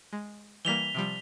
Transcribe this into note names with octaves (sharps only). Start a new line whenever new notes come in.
G#3
E3 G3 A#3 B6 F7 G7
C3 F3 G3